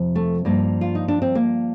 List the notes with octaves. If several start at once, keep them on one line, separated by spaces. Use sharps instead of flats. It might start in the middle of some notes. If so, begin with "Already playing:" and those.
Already playing: F2 C3 F3
A3
G2 F3 A#3
F4
D#4
D4
C4
A#3